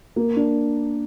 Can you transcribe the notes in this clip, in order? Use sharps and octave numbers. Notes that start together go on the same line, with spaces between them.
A#3
D4